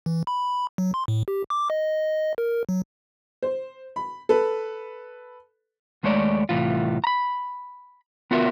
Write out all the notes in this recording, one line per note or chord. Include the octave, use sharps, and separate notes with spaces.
E3
B5
F#3
C6
A2
G4
D6
D#5
A#4
F#3
C5
B5
A4 B4
D#2 G#3 A3 C#5 D5
C2 A2 E3 F4
A#5 B5
B3 F4 F#4 A#4 E5